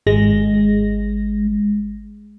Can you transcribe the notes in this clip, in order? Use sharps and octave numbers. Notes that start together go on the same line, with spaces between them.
G#1 G#3 A#6